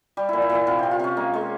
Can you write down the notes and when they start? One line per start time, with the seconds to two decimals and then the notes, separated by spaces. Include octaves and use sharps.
0.17 G3 G4
0.29 A#2 E4
0.42 E4
0.49 A#2
0.55 E4
0.67 C3 F4
0.79 C3 G4
0.91 F4
1.00 C3 C#4
1.17 G#3 A#3
1.34 G#3